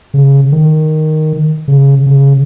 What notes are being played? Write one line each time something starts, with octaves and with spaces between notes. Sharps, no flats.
C#3
D#3
C#3
C#3